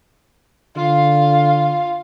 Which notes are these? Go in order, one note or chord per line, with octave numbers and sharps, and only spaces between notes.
D3 F4 F5